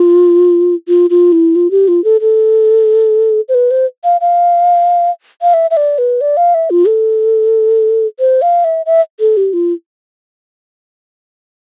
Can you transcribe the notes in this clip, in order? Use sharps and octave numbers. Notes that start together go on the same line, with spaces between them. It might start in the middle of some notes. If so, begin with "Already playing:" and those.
Already playing: F4
F4
F4
E4
F4
G4
F4
A4
A4
C5
B4
C5
F5
F5
F5
E5
E5
D5
B4
D5
F5
E5
F4
A4
C5
F5
E5
E5
A4
G4
F4